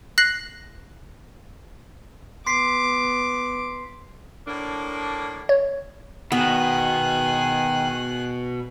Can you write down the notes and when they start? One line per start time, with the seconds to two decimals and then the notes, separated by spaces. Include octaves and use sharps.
0.18 F#6 A#6 C7 F#7
2.46 B3 C6 D6 B6 C7
4.46 A2 A#3 D4
5.49 C#5
6.32 B2 D#3 B3 G#4 F#6